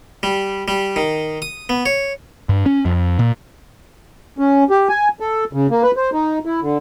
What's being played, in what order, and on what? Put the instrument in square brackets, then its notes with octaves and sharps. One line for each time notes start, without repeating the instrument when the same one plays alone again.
[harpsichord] G3
G3
D#3
D#6
B3
C#5
[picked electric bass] G2
C#4
F2
A#2
[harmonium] C#4
G4
G#5
A4
C#3
A#3
B4
C5
D#4
E4
D3